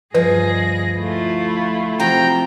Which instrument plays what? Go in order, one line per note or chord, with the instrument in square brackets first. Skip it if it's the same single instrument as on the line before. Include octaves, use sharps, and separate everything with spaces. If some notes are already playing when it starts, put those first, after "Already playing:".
[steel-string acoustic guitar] D2 F3 D#5 [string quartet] G2 G#4 A#6 [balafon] B4
[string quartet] A3 E4 F4
[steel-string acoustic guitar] C3 F3 F#3 [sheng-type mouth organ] G5 A#5